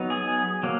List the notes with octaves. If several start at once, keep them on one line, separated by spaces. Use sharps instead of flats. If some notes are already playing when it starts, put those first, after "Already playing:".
Already playing: F#3 B3 D#4
G#4
F#3 A#3